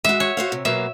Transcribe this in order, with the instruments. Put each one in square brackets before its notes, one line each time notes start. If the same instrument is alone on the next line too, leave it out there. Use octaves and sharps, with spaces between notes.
[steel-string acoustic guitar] G#3 F#4 [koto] E5
[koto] C#5
[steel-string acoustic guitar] F#4 C5 F5
C3
[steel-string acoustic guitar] B2 F#3 A#3 [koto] E5